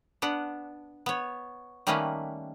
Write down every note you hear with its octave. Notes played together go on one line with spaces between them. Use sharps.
B3 D4 F#5
B3 C#5
D#3 G3 A3 A#3 C#4 B4